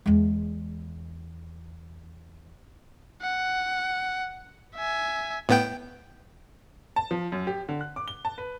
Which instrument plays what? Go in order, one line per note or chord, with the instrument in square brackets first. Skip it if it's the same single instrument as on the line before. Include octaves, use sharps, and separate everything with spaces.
[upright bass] E2 G#3
[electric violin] F#5
E5 G#5
[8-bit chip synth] A2 B3 G5
[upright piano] A5
F3
F#2
G4
D3
F#6
D6
G7
A5
B4